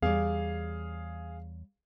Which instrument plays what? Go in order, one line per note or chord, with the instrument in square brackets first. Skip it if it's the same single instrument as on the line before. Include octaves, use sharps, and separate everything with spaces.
[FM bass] E2 [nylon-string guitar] G3 C#5 D5 [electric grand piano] G#4 F5